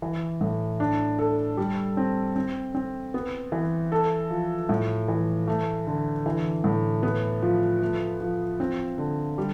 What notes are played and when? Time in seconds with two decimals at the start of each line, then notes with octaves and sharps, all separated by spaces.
0.02 E3
0.41 A2
0.80 D4
1.19 A4
1.57 G3
1.97 C4
2.36 C4
2.75 C4
3.14 B3
3.52 E3
3.92 A4
4.30 F3
4.69 A2
5.08 E3
5.47 A3
5.87 D3
6.26 E3
6.64 A2
7.03 B3
7.42 F3
7.81 A3
8.20 F3
8.60 C4
8.98 D3
9.38 G3